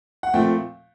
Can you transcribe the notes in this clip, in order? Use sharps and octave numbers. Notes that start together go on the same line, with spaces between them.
F#5
A#2 F3 A3 C4 G5